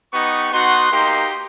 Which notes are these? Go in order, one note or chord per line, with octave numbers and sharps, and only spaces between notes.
B3 D#4 G4 C#6
B3 D#4 F#4 C6
A#3 D#4 G4 C6